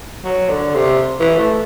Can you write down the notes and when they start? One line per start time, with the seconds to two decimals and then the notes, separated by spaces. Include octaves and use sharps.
0.25 F#3
0.49 D3
0.75 C3
1.20 E3
1.39 A3